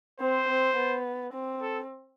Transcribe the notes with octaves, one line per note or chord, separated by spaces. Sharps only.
C4 C5
C4
B3
C4
A4